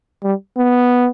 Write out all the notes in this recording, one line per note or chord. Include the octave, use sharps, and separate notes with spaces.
G3
B3